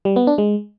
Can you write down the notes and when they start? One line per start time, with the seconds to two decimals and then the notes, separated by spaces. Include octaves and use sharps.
0.05 G3
0.16 B3
0.27 D4
0.38 G#3